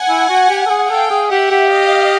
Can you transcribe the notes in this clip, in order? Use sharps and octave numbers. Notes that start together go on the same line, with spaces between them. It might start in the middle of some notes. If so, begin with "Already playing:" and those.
Already playing: F#5 G#5
E4
F#4
G4
A4
G#4
A4 F5 G5
G#4
G4 E5 F#5
G4
D#5 F5